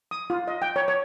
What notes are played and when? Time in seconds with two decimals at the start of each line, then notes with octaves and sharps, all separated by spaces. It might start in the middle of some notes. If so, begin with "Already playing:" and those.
0.11 D#6
0.30 F4
0.48 D#5
0.62 G5
0.76 C#5
0.88 C#5